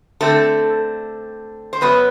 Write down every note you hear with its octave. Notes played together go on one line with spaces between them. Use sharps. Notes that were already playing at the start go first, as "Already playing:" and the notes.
D3 A3 C4 A4
C5
F#2 F#3 B3 B4